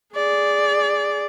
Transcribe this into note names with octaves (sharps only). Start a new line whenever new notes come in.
G#4 D5